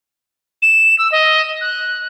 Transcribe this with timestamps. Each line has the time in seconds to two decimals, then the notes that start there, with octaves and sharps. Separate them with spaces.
0.62 E7
0.99 E6
1.12 D#5
1.61 F#6